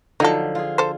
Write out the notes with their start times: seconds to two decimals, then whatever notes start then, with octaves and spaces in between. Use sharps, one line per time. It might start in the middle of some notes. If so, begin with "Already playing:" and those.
0.20 D3 F3 F#3 D#4 A4
0.55 F4 G#4
0.78 A4 C5